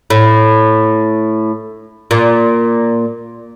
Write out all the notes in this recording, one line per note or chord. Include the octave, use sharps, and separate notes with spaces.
A2
A#2